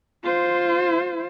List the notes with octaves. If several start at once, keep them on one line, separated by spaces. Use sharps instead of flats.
F4 C5